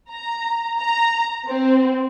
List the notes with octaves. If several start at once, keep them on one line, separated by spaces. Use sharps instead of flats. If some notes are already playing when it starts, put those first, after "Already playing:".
A#5
A#5
C4